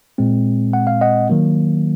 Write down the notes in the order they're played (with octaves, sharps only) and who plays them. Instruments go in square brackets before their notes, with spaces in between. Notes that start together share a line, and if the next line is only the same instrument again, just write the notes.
[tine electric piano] A#2 G#3 C4
F#5
F5
D#5 F#5
D#3 F#3 A#3